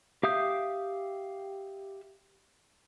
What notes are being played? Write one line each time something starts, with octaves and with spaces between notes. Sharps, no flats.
G4 E5 F5 D#6 G6